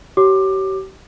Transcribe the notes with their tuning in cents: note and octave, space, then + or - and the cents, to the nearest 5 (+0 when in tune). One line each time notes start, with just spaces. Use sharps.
G4 -40 C#5 -10 D6 +20